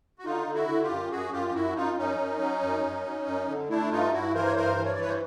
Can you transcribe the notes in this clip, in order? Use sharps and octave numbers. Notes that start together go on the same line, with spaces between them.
F#4
D3 D#4 F4
D3
E4 F#4
D3
F4 G4
F#2
F#2 F#4 G#4
F#2 F4 G4
G4
F#2 E4 F#4
F#2 D#4 F4
F#2 C#4 D#4
F#2
F#3
F#2
F#2
F#3
F#2
D3
A3 D4 E4
G2 D#4 F4
G2 E4 F#4
E3 A#4 C5
C#5
G2 A#4 C5
E3
C#5
D5
G2 B4 C#5
C5